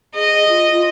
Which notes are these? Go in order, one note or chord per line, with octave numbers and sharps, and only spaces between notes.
G#4 D#5
F4
F4